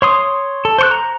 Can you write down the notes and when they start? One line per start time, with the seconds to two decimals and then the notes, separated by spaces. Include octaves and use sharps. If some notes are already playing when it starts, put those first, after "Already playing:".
0.02 C#5 C6 D#6
0.65 A4
0.78 C5 C#6 F#6
0.91 A#5